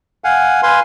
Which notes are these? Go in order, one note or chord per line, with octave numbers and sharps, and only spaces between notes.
F5 F#5 G#5
B4 F5 G#5 C6